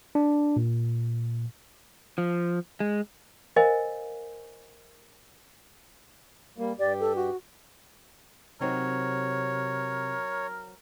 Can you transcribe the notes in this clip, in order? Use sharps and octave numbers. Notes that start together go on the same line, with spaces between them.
D4
A#2
F3
G#3
A#4 C5 D#5 F5 G#5
G3 A#3
G2 G4 D5
A4
F#4
C3 F#3 C4 D#4 A#4 C#5